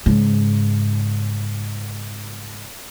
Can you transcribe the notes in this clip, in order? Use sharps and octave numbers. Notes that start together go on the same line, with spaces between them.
G#2 C#3